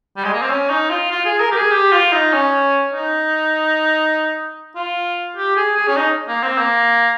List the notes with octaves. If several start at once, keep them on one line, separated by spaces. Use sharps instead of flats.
G3
G#3
A#3
C4
C#4
D#4
F4
F4
G#4
A#4
G4
G#4
G4
F4
D#4
C#4
D#4
F4
G4
G#4
G#4
C#4
D#4
A#3
C4
A#3